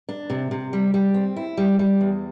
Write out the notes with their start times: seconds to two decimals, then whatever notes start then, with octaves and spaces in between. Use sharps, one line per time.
0.09 D4
0.30 C3
0.51 C3
0.73 G3
0.94 G3
1.14 C4
1.36 E4
1.57 G3
1.79 G3
2.01 E2